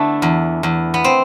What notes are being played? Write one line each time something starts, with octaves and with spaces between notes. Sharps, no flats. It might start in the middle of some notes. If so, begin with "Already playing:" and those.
Already playing: D3 A3 B3 D4 E4
E2
E2
B3
C4